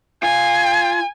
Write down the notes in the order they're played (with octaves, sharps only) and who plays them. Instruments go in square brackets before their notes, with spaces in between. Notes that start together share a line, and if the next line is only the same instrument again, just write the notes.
[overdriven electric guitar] F4 [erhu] G#5